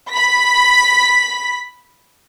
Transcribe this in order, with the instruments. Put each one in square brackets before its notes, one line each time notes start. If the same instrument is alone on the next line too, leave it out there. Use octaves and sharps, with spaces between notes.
[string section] B5 B6